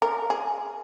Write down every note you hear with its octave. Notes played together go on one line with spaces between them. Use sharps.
A#4
G#4